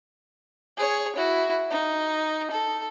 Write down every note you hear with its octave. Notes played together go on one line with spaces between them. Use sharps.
G#4 C#5
E4 F#4
D#4
A4